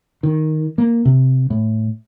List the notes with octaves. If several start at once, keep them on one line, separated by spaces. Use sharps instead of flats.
D#3
A#3
C3
A2